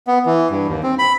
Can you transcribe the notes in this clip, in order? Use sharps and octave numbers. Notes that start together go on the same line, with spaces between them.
B3
E3
G2
D#2
C4
B5